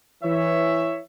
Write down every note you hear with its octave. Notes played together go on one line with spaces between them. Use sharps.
E3 C#5 E5